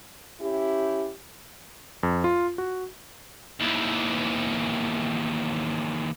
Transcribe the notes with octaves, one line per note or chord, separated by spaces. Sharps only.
C#4 E4 G4
F2
F4
F#4
D#2 E3